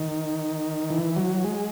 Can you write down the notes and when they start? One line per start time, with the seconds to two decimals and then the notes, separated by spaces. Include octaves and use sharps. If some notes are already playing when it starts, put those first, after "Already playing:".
Already playing: D#3
0.90 E3
1.17 F#3
1.44 G#3